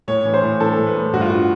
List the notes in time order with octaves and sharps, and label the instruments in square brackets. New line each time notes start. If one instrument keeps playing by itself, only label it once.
[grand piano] A2 C#5
E3
C5
A2
E3 A4
A2
B4
A2
G2 F#4
F4
F#4